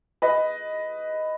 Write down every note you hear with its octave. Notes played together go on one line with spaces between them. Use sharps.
B4 D#5